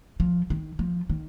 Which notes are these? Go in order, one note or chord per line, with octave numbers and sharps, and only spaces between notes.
F3
D#3
F3
D#3